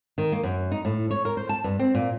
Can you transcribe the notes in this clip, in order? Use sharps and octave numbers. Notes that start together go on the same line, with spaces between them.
D#3
A#3
F#2
D#4
A2
C#5
A#4
C5
A5
G2
C4
A#2